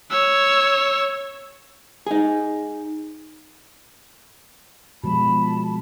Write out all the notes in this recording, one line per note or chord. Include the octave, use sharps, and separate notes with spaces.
C#5 E6
D#4 G#4
B2 F3 G#3 A5 B5